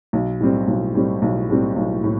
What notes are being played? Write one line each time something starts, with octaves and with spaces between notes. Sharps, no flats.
B1
A2 G3 C4
B1
A2 G3 C4
B1
A2 G3 C4
B1
A2